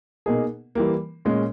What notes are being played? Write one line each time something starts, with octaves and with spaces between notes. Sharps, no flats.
B2 A#3 D#4 G#4
E3 G3 A#3
A#2 G#3 C#4